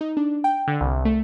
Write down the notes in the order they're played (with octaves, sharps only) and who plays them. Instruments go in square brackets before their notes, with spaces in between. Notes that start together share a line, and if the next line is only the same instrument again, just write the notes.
[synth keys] D#4
D4
G5
D3
C2
A3